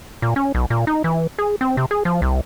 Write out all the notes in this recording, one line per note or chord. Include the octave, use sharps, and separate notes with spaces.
A#2
C#4
B1
A#2
D#4
E3
G#4
C4
C3
G#4
F3
C2